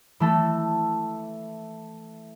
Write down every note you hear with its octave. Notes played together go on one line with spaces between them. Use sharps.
E3 A3 A4